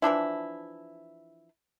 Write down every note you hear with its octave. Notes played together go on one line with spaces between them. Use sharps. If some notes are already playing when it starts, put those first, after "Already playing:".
E3 F3 D4 E4